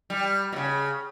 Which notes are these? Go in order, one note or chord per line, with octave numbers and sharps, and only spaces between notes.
G3
B2
C#3